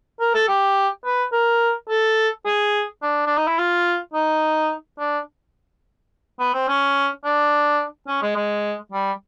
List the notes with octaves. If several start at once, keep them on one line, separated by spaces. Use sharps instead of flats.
A#4
A4
G4
B4
A#4
A4
G#4
D4
D4
D#4
E4
F4
D#4
D4
B3
C4
C#4
D4
C#4
G#3
G#3
G3